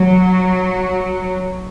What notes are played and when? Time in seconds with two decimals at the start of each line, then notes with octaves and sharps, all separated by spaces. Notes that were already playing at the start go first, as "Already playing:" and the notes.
Already playing: F#3